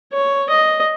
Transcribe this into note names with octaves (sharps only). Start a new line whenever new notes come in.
C#5
D#5